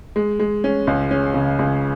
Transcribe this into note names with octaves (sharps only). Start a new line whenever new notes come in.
G#3
G#3
C#4
C#2
C#4
C#3
C#2